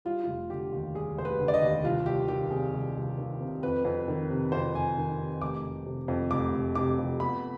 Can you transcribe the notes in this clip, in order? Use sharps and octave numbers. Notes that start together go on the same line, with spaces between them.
G3 F4
F1 F4
D3 G4
D#2
G3 G#4
F1 C5
B4
D3
D5
D#5
D#2
C2 F4
C2 G4
D#3 G4
C3 G#4
C2
C2
D#3
C3
F2 B4
F2
D#3
C3
F2 C5
F2 G#5
D#3
C3
F1 D6
F1
C3
F2
F1 D6
F1
C3 D6
F2
B3 B5